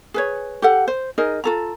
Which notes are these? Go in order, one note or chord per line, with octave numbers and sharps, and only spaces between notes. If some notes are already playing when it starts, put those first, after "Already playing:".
G#4 B4 C#5
G4 A4 F#5
C5
D#4 G#4 A#4 D#5
F4 A4 A#5